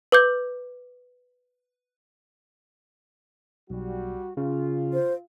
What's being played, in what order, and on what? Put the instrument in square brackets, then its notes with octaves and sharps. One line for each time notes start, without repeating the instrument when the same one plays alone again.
[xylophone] B4 D6 G6
[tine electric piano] B1 [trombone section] G3 F#4
[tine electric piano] C#3 [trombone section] F4
[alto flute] C5